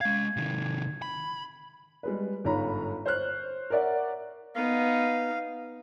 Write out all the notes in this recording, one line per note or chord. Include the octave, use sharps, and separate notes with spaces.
G#3 F5 G#6
C3 D#3
B5
G3 G#3 B4
G1 G#2 F4 C#5 A#5 B5
C5 C#5 F6 F#6
A#4 C#5 D5 E5 F#5
B3 D#4 F5